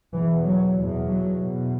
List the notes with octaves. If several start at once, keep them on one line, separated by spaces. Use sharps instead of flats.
E2 B2 E3
F#3
E2 B2
F#3
E2 B2